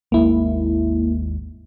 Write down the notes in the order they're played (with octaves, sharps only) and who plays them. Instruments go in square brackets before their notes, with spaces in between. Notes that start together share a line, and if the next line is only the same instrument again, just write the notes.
[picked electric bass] G#1 D#2 G#3 [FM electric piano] A#3 E4